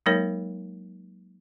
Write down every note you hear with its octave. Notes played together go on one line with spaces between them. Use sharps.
F#3 G#3 A#3 D#4 A#4 C#5